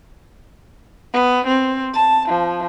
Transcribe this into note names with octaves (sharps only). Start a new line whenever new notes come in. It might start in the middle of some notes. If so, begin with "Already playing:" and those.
B3
C4
A5
F3